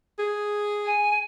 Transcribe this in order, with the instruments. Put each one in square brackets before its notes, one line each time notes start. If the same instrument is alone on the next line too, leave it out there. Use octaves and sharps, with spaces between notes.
[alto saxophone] G#4
[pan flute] G#5